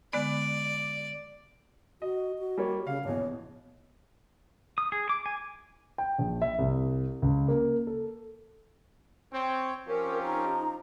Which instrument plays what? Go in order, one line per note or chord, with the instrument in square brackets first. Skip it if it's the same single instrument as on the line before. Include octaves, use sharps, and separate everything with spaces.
[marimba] D3 G#3 B3 [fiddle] D5
[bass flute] F#4 [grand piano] D#5
[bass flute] F#4
[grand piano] G3 A#3 C#5
[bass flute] C#3 [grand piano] F5
[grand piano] A#1 E2 B2 [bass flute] C#5
[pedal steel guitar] D#6
G#4
D6
G#5
[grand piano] G5
A#1
E5
C2
C#2
A#3
A4
[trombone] C4 [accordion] C#5 G5
[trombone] F3 [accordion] C4 C#4 G4 [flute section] A#4
[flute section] D#4 A#5